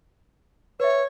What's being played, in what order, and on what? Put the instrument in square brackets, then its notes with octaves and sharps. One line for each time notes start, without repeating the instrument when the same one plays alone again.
[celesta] B4 E5 [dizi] C#5